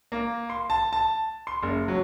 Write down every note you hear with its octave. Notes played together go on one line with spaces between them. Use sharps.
A#3
C6
A5
A5
C6
F#1
F#3